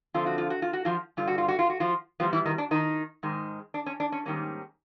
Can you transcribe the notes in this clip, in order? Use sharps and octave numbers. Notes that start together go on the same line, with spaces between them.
D3 F3 A3 C4 F4
F#4
F4
F#4
F4
F#4
F3 F4
G2 D3 G3 F4
F#4
F4
F#4
F4
F#4
F3 F4
E2 B2 F3 G3 B3 F4
E3 E4
D#3 D#4
D4
D#3 D#4
G#2 D#3 G#3
D4
C#4
D4
C#4
G#2 D#3 G3 A#3 C#4